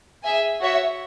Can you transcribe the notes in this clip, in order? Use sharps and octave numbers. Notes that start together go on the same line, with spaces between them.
G#4 E5 G#5
F#4 C#5 E5